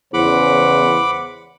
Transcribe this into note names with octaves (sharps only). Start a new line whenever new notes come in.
E2 C#3 C5 F#5 B5 D6